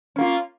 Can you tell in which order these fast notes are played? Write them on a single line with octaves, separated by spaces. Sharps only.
C#4 A#3 F4